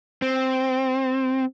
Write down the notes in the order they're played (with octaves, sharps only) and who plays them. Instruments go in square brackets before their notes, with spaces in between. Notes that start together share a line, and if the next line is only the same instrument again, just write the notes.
[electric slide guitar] C4